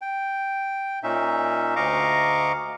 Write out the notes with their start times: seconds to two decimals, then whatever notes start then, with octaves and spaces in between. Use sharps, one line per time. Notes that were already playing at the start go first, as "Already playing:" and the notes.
0.02 G5
1.03 A#2 C#4 D#4 E5
1.76 D2 D#5 F5 A#5 C#6 D6